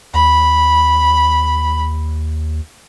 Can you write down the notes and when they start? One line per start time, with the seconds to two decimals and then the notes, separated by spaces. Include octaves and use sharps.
0.14 D#2 B5